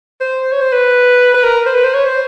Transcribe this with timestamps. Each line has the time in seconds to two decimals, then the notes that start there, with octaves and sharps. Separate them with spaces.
0.20 C5
0.52 C#5
0.61 C5
0.72 B4
1.34 B4
1.44 A#4
1.66 C5
1.74 B4
1.84 C5
1.94 C#5
2.05 C5